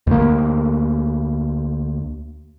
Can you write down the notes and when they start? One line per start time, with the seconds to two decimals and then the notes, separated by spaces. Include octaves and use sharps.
0.07 D2 A#3